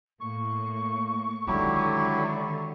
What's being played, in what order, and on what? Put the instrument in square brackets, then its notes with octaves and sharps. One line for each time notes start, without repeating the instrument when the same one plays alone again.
[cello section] A2 A#3 [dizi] C#6
[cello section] D3 [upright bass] D#3 G#3 [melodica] F#3 E4 G4